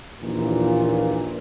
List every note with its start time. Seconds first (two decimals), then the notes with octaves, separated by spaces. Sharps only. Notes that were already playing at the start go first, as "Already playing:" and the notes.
0.21 A#1 D#2 A#2 E3